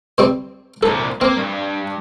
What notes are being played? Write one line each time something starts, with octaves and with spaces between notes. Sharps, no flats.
G3 C4 C5
C2 A#2 A4
A#3 C4
G2